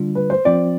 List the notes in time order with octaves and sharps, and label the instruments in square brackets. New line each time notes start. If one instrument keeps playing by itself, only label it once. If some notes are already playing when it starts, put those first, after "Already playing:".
Already playing: [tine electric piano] D3 G3 D4 F4
[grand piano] B4
C5
[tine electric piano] F3 C4 F4 C5 [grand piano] D5